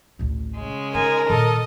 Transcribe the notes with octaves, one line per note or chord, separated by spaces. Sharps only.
A1 D2
C#3 G#3
D3 D#4 A#4 G#5
A#2 D#3 A4 D#5